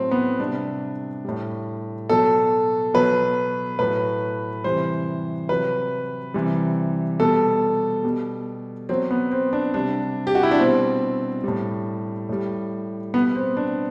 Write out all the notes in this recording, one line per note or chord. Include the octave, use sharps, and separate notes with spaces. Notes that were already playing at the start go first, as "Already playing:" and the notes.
Already playing: A2 F#3 C4
B3
C3 G3 D4
A2 G3
B2 F#3 A4
B2 F#3 B4
A2 F#3 B4
C3 E3 G3 C5
C3 F#3 B4
C3 E3 G3
B2 G3 A4
B2 G3
B2 F#3 C4
B3
C4
D4
C3 G3 D4
G4
F#4
E4
D4
B2 G3 C4
A2 G3
A2 G3
B2 G3 B3
C4
D4